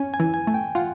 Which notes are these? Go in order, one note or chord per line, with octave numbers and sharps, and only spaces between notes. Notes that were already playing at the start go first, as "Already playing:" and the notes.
Already playing: C#4 G#5
G#5
E3
G#5
A3
G5
F4 F#5